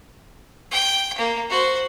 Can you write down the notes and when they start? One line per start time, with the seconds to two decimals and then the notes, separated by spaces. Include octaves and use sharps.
0.71 G5
1.18 A#3
1.50 F#4 C5